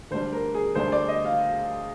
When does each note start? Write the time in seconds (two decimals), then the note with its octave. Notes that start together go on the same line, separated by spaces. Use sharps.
0.11 D2 D3 G3 D4 C5
0.33 A#4
0.54 G#4
0.75 D2 D3 G3 D4 C5
0.92 D5
1.08 D#5
1.25 F5